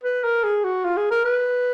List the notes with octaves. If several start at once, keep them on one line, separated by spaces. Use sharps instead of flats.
B4
A#4
G#4
F#4
F4
G#4
A#4
B4